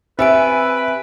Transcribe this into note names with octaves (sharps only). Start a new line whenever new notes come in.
C4 G4 B4 E5 G#5 D7